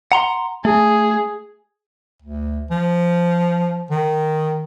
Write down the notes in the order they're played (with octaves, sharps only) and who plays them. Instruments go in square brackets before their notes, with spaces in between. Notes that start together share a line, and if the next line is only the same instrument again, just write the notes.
[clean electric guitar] F#5 A#5 C6
[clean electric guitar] A3 [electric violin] G#4
[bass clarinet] D2
F3
D#3